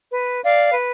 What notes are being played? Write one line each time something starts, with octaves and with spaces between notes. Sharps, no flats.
B4
D5 F5
B4